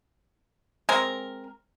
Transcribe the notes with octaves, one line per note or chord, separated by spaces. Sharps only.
G#3 C4 A#4